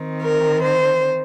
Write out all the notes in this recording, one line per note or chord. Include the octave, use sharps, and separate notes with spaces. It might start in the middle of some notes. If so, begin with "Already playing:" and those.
Already playing: D#3 C4
A#4
C5